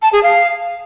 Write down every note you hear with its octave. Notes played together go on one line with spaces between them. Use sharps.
A5
G#4
F5